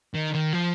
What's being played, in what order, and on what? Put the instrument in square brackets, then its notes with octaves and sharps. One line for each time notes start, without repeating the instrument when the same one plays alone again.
[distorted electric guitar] D#3
D#3
F3